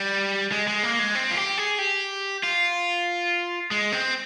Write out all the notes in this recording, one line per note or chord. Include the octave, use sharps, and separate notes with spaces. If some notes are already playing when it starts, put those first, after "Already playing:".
Already playing: G3
G#3
G#3
A#3
G#3
C4
F4
G4
G#4
G4
F4
G#3
C4